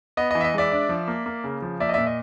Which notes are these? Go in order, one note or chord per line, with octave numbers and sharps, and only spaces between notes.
B3 D#5
E3 D#5
E5
D#5
G#3 D5 E5
D4
F3
A#3
A#3
C#3
F3
A#3 D5 E5
D#5
A#2 D5 E5
D#5